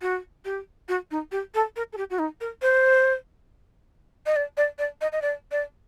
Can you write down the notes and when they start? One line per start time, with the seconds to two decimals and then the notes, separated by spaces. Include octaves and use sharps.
0.02 F#4
0.45 G4
0.89 F#4
1.11 D#4
1.32 G4
1.55 A4
1.76 A#4
1.93 A4
1.97 G4
2.10 F#4
2.19 D#4
2.41 A#4
2.62 C5
4.26 D#5
4.36 D5
4.57 D5
4.79 D5
5.01 D#5
5.12 D#5
5.22 D5
5.52 D5